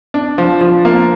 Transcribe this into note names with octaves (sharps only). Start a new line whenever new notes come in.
D4
F3
F3
A#3